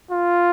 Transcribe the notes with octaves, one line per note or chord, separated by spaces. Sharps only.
F4